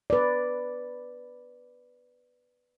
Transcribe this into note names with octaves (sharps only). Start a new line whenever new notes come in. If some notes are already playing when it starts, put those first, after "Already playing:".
B4 D5